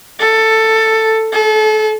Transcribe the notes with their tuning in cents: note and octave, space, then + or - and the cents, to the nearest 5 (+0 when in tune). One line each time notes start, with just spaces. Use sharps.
A4 +10
A4 -35